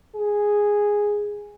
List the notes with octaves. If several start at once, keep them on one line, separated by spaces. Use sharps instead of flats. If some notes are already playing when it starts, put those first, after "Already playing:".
G#4